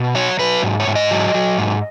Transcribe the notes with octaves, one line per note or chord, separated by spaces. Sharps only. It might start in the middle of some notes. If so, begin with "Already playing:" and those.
Already playing: B2
F#3 C#5
F#3 B4
G#2
C#5
G#2
D#5
F#3
F#3
G#2